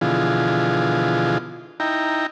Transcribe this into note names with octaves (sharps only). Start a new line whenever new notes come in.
B2 D3 E3 F3 F4 G#4
D#4 E4 G5 A#5